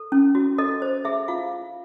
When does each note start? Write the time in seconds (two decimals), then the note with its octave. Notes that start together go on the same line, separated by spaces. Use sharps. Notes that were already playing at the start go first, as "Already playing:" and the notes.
Already playing: A4
0.12 C#4
0.35 F#4
0.58 A4 D#5
0.82 C5
1.05 G#4 E5
1.28 F4 F5